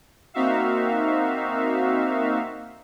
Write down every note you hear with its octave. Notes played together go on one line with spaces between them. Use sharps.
A#3 C4 D#4 F#4 E5 F5